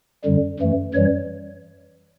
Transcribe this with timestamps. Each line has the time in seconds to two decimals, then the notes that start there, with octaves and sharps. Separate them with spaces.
0.24 F#2 D3 G3
0.59 F#2 E3 A3
0.94 F#2 E3 G3 C#5